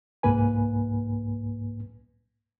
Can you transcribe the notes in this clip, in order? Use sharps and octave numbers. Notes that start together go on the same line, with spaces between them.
C2 G#2 A#3 B4 G#5